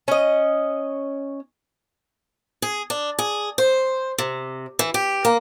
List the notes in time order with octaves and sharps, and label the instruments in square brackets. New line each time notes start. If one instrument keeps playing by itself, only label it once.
[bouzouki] C#4 D#5
[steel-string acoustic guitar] G#4
D4
G#4
C5
C3
E3
G4
A#3